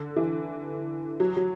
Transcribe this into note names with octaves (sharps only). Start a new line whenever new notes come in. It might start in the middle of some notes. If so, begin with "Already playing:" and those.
Already playing: D3
E3
F#3
F#3